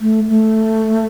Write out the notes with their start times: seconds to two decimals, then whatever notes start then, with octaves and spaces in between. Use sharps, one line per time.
0.01 A3
0.29 A3